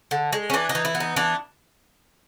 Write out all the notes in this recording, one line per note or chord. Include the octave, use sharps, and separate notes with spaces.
D3
G#3
C#4
E3 D4
D#4
E3
E4
B3
D#4
E3 D4